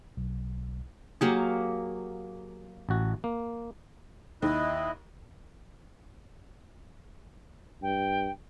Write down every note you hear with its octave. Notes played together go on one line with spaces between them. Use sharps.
B1
F#3 A#3 G4 G#4
A1 F#4
A#3
D#2 E4 D#5 F#6
G2 G5